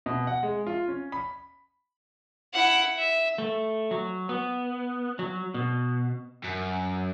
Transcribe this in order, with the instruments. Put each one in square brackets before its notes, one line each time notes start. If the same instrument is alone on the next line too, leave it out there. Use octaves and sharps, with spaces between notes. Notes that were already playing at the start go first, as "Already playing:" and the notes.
[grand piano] B2
F#5
G#3
F4
C#4
B5
[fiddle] E4 F#5
E5
[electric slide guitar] A3
F#3
B3
F#3
B2
[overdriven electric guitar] F#2